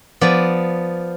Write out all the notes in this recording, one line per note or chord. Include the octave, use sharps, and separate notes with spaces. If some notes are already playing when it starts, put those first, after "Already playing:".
F3 B3 D5